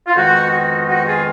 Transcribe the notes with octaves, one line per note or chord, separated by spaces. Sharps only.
F4
F2 D#3 G#3 B3 D#4 F#4
D#4 F#4
D#4 F#4
F4 G#4